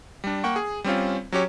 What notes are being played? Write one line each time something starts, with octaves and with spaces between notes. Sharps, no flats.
G3 D4
A#3 F#5 G5 C#6
G#4
G3 C4 C#4 F4
F#3 C#4 G4 C#5